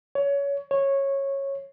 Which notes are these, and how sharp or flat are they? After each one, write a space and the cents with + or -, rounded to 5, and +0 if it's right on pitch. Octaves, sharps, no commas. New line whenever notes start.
C#5 +20
C#5 -15